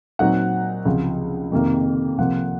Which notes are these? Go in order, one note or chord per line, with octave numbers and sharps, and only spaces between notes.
A#2 F#3 C4 D#4 F#5
C#2 C3 F3
F2 C3 D#3 A#3
C2 C3 F3 A#3 F#5